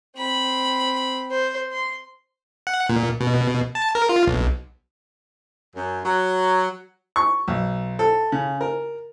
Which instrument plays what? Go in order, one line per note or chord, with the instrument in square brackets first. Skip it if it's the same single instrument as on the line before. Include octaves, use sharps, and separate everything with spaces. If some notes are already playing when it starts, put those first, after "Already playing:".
[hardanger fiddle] C4 B5
C5
C6
[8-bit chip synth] F#5
A#2
B2
A5
A#4
F4
B1
[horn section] F#2
F#3
[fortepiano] C#6
B1
A4
C#3
A#4